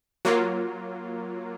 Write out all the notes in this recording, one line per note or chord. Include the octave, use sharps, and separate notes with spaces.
F#3 A#3 F4